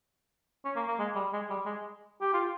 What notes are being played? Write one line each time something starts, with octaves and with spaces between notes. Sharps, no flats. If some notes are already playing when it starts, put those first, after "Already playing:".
C#4
A#3
A#3
G#3
G3
G#3
G3
G#3
G4
F4